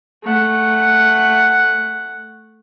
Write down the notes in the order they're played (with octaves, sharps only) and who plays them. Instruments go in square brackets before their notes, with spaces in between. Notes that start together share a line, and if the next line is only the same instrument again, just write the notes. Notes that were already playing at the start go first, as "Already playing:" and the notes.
[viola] A3 F#5